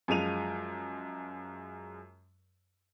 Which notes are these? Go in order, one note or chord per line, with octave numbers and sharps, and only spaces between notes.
F#2 F3 G#3 D#7 F7